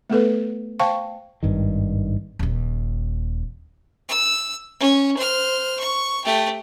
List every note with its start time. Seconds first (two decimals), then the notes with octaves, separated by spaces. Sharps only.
0.10 A3 B3 A4 B4
0.79 C5 F5 G5 A5 C#6
1.43 G#1 G2 D#3
2.39 D#1 D#2
4.09 E6
4.80 C#4
5.17 C5 F6
5.79 C#6
6.24 A3 G4